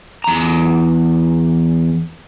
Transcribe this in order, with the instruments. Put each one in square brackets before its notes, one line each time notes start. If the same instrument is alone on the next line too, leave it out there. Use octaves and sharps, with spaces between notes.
[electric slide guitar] E2 A#5